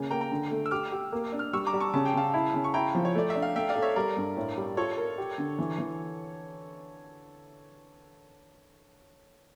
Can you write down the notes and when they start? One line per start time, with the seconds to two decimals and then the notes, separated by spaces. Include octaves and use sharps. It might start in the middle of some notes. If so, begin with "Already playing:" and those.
Already playing: C#3 A#3
0.11 A#3 G5 A#5
0.21 G5 A#5
0.32 D3
0.51 A3
0.66 E6
0.71 G4 D6 F6
0.92 G4
1.12 A#3
1.32 D4
1.39 F6
1.53 G3 C#6 E6
1.67 A#5 D6
1.73 G3
1.80 A5 C#6
1.94 C#3 A5
2.05 G5
2.14 C#3 F5 A5
2.34 E4
2.54 C#3
2.64 C#6
2.74 E4 G5 A#5
2.95 F3
3.05 C#5
3.15 A3 D5
3.30 E5
3.35 D4
3.42 F5
3.56 A3 E5 G5
3.69 D5 F5
3.76 A4
3.82 C#5 E5
3.96 G3 A#4 D5
4.16 G2
4.37 A2
4.57 G3
4.77 F4 A4 C#5
4.97 A#4
5.18 G4
5.38 D3
5.59 E3
5.78 E3